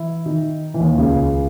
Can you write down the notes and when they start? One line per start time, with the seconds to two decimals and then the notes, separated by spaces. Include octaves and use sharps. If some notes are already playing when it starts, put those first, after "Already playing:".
Already playing: E3 E4
0.26 D#3 D#4
0.74 E3
0.80 D#2 D#3
0.98 C#2 C#3